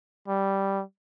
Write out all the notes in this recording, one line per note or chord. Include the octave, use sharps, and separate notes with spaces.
G3